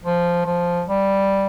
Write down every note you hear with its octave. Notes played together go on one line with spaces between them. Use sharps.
F3
F3
G3